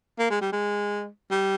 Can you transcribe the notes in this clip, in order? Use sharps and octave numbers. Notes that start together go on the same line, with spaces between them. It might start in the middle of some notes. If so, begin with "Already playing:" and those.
A#3
G#3
G3
G#3
G3